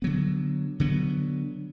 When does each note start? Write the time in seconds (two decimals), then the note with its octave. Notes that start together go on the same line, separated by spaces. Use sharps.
0.02 D3 F#3 B3
0.80 D3 F#3 B3